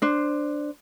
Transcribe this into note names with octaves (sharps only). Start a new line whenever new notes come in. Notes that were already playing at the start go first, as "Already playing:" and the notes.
D4 C5